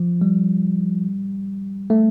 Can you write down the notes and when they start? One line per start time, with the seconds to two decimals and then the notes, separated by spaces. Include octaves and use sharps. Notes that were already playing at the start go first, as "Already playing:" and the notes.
Already playing: F3
0.21 G3
1.90 A3